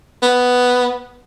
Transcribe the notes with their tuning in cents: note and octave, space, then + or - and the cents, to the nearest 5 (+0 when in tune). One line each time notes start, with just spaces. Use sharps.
B3 +5